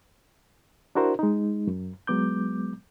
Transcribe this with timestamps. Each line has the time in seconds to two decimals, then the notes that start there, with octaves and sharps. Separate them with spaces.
0.95 D4 E4 F#4 A#4 C5
1.19 G#3 D#4
1.67 F#2
2.07 F#3 G#3 B3 D6 G6